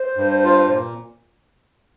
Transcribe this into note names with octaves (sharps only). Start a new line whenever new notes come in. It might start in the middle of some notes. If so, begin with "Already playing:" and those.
Already playing: C5
G2
F4
A#2